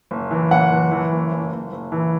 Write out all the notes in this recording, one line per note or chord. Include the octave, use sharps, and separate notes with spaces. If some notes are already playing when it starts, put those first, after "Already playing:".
F#1
E3
F#1 F#5
E3
E3
F#1
F#1
F#1
F#1
E3